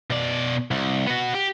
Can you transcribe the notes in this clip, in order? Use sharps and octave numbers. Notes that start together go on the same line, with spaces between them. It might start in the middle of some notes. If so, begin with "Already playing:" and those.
B2 D5
C2
B3 F#4
G4